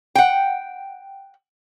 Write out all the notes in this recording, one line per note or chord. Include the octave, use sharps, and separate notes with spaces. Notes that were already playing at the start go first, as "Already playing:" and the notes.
F#5 G5